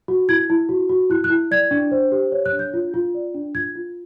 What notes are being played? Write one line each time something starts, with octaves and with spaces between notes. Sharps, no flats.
F#4
E4 G#6
E4
F#4
F#4
E4 F#6
F#6
E4
D5 G#6
D4
C5
G4
C#5
F#6
D4
G6
F4
F4
D5
D4
F4 G#6
F4